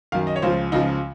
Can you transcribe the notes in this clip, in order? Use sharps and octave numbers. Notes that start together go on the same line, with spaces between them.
F#2 D#3 F5
D#5
C#5
C#2 C#3 F3 C5
C#2 C#3 F3 D#4